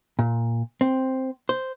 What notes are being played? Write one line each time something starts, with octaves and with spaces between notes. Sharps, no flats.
A#2
C4
C5